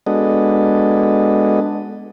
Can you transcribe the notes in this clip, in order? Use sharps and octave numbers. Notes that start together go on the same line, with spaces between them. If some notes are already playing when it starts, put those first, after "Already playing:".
G#3 B3 D4 F#4 A4 D#5